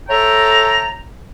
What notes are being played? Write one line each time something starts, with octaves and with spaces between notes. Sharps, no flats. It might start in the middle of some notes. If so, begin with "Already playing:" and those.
A4 C#5 E5 G5 A5 A#5